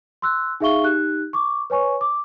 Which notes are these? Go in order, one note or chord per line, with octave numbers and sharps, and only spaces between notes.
C6 E6 F#6
D#4 G#4 E5 F5 C#6 G7
D#4 G4 F#6
C#6 D6
B4 C#5 G#5 C#6
D6